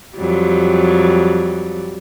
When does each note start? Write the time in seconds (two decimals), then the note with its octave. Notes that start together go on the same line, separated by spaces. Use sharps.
0.16 F2 F#3 G3